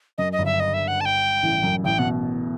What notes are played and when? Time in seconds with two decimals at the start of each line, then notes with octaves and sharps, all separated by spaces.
0.18 F#2 D#5
0.33 D#5
0.38 G1 G2
0.45 E5
0.60 D#5
0.74 E5
0.88 F#5
1.01 A5
1.05 G5
1.43 A1 A2
1.63 F#2
1.84 A1 A2 G5
1.99 B2 F#5